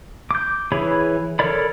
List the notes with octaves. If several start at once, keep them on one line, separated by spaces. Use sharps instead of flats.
D6 G6
E3 G#4 C#5 B5
A4 A#4 C#5 D5 B5